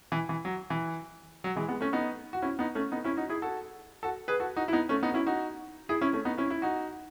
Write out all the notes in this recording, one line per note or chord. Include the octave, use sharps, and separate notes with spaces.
E3
E3
F#3
E3
F#3
E3 G#3
G#3 B3
A3 C#4
B3 D#4
F#4
C#4 E4
B3 D#4
A3 C#4
B3 D#4
C#4 E4
D#4 F#4
E4 G#4
F#4 A4
F#4 A4
G#4 B4
F#4 A4
D#4 F#4
E4
B3 D#4
A3 C#4
B3 D#4
F#4
C#4 E4
D#4 F#4
E4 G#4
C#4 E4
A3 C#4
B3 D#4
C#4 E4
E4
D#4 F#4